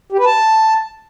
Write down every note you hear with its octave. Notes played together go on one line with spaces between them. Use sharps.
G4
B4
A5